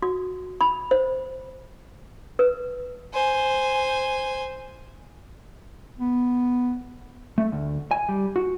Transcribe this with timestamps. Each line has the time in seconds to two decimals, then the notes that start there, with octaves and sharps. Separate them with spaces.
0.02 F#4
0.61 B5
0.91 C5
2.39 B4
3.14 C5 G#5
6.00 B3
7.38 A3
7.52 D2
7.91 G#5
8.09 G3
8.36 F#4